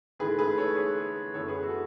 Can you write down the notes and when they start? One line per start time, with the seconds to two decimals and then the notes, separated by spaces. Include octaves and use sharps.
0.19 G#2 E3 A3 G#4 B4
0.39 G#4 B4
0.57 A4 C#5
0.77 G#4 B4
1.34 F#2 E3 B3 A4 C#5
1.48 G#4 B4
1.63 F#4 A4